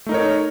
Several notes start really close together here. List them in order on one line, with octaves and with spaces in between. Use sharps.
A3 D#4 A#4 C#5